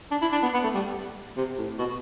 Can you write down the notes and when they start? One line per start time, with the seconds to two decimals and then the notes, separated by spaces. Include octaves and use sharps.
0.11 D4
0.22 E4
0.32 D4
0.43 B3
0.54 B3
0.64 A3
0.74 G3
1.37 C3
1.58 A2
1.79 B2